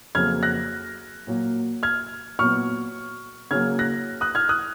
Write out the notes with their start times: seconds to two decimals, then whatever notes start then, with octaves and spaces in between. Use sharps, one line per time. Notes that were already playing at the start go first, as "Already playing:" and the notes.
0.15 F2 C#3 F#3 A#3 F6 G#6
0.43 F#6 A#6
1.27 A#2 F#3 A#3
1.83 F6 G#6
2.39 A#2 F#3 B3 C#6 F6
3.51 C#3 F#3 A#3 F6 G#6
3.79 F#6 A#6
4.21 D#6 F#6
4.35 F6 G#6
4.49 D#6 F#6